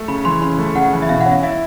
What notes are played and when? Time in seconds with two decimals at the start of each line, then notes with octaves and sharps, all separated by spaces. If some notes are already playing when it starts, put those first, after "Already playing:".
Already playing: A3
0.08 C#3 B5
0.25 E3 C6
0.42 C#3 C6
0.59 A3
0.75 C#3 F#5
0.93 E3
1.02 E5
1.09 B2 F5
1.21 F#5
1.26 C#4
1.32 F5
1.43 E4 E5